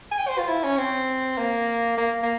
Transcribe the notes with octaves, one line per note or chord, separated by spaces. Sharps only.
G#5
G5
C5
F4
E4
C#4
C4
A#3
A#3
A#3